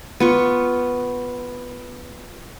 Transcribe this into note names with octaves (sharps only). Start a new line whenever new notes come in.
B3 F4 C#6